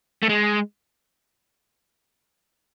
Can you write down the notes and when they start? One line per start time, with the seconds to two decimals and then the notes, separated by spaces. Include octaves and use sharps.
0.23 A3
0.29 G#3